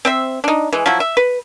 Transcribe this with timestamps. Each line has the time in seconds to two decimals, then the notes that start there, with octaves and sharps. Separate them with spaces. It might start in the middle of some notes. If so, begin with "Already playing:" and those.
0.05 C4 C5 E5
0.44 D4 D#4
0.73 E3 G#3
0.86 F3 F#3 E4
1.00 E5
1.17 B4